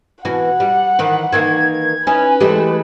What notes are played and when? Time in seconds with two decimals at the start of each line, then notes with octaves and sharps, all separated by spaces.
0.25 B2 E3 F#4 F#5
0.60 G3
0.99 D#3 E3 B4
1.32 D#3 E3 A#3 G#6
2.07 C#4 D#4 E4 B4 G#5
2.40 E3 G#3 A3 G4